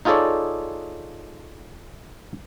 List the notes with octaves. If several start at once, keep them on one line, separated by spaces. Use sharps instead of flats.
D#4 F4 G#4 A4 C#5 D5